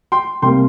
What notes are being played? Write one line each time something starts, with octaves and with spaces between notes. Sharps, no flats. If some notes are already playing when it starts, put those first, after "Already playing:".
G5 C6
C2 C3 G3 A#3 G5 C6